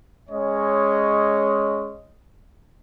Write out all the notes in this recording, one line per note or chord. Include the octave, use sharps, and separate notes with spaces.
G#3 C#4 C#5 D#5